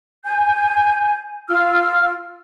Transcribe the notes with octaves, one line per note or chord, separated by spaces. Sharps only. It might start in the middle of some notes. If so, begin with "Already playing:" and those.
G#5 G6
F4 E6 F6